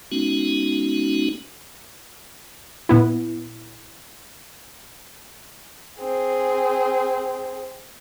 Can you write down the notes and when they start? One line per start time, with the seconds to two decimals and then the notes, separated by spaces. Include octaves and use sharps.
0.12 G#3 B3 C#4 D#4 F#4
2.89 A#2 B3 E4
6.00 C4 G#4